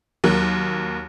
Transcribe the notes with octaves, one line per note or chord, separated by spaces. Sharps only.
D#2 F#3 A#3 F#6